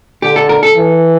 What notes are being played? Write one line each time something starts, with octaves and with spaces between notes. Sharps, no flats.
D3 G4
A4
A#4
A4
E3